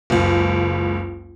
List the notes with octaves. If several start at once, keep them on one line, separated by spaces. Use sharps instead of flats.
F#1 C#2